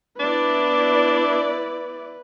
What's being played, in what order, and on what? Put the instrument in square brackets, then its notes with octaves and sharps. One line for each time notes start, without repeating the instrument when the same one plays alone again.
[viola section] B3 E4 D5 [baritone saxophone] D4 [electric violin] B4